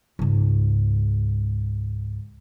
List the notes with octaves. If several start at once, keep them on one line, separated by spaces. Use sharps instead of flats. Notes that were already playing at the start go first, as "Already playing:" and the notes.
C#2 G#2